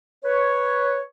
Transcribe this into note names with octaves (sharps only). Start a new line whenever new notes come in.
B4 C#5